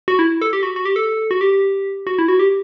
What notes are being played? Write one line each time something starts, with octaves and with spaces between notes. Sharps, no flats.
F#4
E4
A4
G4
F#4
F#4
G4
A4
F#4
G4
F#4
E4
F#4
G4